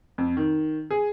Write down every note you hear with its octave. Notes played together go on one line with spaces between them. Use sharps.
F2
D#3
G#4